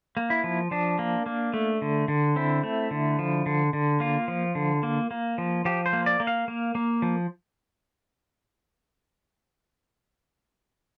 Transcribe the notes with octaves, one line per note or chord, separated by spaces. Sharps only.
A#3
E4
F3
F3 D4
A#3
A#3
A3
D3
D3
C4 E4
A3
D3
F3
D3
D3
A#3 F4
F3
D3
A#3
A#3
F3
F3 G4
C5
A#3
D5
A#3
F5
A#3
A#3
F3